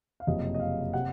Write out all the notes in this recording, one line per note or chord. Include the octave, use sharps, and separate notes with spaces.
F5
F#1 F2 C3 D#5
D#5
F5
C3 F#5